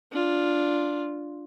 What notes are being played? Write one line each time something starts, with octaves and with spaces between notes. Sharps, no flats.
D4 F4